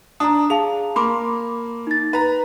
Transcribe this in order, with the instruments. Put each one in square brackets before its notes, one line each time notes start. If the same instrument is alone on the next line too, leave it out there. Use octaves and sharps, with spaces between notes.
[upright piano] D4 [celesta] A#5 D#6
[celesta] G#4 F5 A5 [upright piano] F7
[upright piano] A#3 [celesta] B5 C6 D6
[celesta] D#4 A6
[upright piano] B4 A#5